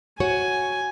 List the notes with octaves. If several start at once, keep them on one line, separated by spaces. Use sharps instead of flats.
F#4 C#5 G#5